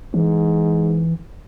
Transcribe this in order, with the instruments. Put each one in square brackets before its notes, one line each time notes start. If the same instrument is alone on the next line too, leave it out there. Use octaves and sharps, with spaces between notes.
[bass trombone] G#2 [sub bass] E3